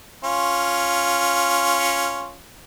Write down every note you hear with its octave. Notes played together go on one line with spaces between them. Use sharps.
C#4 F4